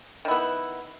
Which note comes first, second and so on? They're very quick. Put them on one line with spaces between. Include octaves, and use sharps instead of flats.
D#3 E4 B3